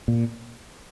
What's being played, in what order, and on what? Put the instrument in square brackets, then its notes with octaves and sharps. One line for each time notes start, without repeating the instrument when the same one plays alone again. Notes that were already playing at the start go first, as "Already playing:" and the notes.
[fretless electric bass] A#2